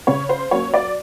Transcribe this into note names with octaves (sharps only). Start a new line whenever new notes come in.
C#3 C#5
C5
F#3 A#3 C#4 C#5
D5